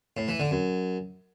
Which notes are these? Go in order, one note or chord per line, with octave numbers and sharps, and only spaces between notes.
A2
E3
D3
F#2